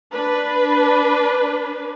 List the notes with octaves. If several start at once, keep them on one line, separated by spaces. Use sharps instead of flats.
D4 B4